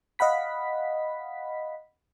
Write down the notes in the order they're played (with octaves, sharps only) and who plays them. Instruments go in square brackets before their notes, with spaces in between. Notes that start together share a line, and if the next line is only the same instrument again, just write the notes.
[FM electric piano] D#5 F5 F#5 B5 B6